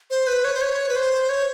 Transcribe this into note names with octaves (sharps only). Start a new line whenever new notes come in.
C5
B4
C#5
C5
C#5
B4
C5
C#5